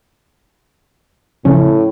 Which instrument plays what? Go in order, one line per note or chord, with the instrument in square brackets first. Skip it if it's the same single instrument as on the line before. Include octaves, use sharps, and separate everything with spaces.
[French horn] A2 [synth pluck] C#3 F3 C#4